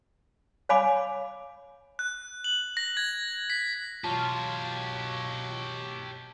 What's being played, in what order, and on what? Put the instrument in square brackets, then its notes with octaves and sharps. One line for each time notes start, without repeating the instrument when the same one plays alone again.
[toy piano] C#5 F5 G#5 B5 D6
[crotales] F#6
F#7
A#6
G#6
B6
[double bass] B2 F#3 [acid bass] F4 [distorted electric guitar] G4 C#5 [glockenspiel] A5